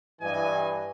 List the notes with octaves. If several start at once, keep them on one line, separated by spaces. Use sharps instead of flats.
G2 E3 D#5 G#5